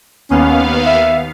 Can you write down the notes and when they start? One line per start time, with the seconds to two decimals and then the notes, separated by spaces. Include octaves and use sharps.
0.30 D#2 B3 C#4 F5
0.86 E5